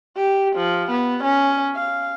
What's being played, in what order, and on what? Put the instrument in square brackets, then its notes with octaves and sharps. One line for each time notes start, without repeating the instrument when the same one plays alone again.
[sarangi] G4
F3
B3
C#4
F5